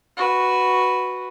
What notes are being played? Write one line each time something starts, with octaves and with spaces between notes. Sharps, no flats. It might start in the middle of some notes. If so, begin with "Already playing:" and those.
F#4 B4